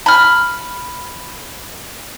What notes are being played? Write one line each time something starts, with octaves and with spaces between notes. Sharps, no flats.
B5 F6